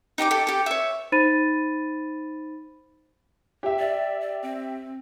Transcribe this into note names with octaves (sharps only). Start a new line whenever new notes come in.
D#4 G4 D#5 D6
G4 A4
G4 A4
C#5 E5
D#4 C5 B5 A6 D#7
G4 E5
D5
D5
C4